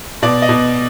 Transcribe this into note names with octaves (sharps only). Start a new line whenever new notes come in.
B2 D5
D#5
B2